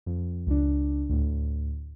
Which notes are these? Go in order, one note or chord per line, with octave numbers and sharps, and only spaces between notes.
F2
C#2 D4
D2 A2